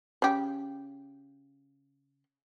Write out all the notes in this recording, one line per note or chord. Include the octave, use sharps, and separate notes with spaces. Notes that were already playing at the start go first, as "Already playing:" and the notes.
C#3 G4